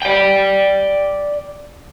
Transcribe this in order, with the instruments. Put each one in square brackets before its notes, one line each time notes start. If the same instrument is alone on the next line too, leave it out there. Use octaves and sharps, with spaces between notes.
[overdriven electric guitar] D5 G5